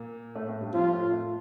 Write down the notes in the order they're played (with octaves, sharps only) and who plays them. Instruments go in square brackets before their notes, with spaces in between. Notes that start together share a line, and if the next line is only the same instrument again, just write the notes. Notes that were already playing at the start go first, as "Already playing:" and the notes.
Already playing: [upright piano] A#2 A#3
A2 A3
A2 A3
G2 G3
[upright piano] F2 F3 [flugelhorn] F4
[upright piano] A2 A3
A2 A3